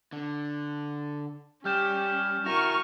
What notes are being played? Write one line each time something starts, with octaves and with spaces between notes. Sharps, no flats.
D3
G3 C#4 G4 F6 G6 E7
E4 F#4 A#4 C#6 F6 A#6 D#7